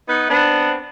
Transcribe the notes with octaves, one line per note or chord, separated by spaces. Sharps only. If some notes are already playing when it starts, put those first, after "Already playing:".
B3 D#4 B4
B3 C4 D4